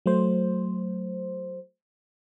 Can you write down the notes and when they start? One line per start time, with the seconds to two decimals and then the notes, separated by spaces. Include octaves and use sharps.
0.06 F#3 A3 C5